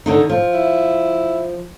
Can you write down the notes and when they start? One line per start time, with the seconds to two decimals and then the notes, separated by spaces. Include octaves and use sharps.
0.06 D3 D#3 D#4
0.30 F3
0.54 E4